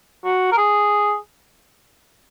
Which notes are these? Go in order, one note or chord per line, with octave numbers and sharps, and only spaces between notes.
F#4
A#4
G#4